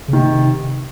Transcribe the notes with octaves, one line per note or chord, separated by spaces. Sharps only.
C#3
C3 D#3